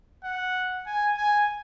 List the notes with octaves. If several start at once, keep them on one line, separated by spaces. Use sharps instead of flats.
F#5
G#5
G#5